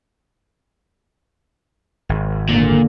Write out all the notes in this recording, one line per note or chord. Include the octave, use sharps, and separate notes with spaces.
G#1
E2 A#2 D3 A#3